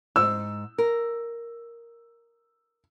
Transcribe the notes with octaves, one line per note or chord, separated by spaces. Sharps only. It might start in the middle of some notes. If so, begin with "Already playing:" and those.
G#2 E6
A#4